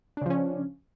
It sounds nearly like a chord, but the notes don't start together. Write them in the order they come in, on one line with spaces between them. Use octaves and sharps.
D4 C#3 F3 C#4